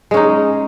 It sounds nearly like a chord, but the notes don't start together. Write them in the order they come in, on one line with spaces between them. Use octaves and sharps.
G#3 C#4 D#4